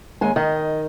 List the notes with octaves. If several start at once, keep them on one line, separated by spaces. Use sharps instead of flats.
D#2 G#3 G#5
D#3 D#5